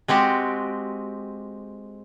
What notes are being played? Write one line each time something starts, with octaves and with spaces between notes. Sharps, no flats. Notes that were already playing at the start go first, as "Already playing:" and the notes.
G#3 C4 F#4 G4